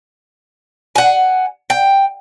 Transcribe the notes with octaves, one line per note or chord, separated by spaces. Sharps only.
F#5 G#5
G5